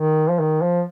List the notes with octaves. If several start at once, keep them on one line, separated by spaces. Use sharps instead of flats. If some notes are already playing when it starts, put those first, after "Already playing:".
Already playing: D#3
F3
D#3
F3